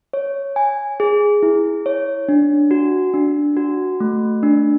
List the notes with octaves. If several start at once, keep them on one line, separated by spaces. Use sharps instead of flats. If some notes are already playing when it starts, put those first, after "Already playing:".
C#5
G#5
G#4
E4
C#5
D4
F#4
D4
F#4
A3
D4